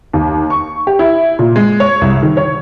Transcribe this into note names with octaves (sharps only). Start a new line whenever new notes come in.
D#2
C#6
G4
E4
A#2
G#3
C#5
C2
D#3
C#5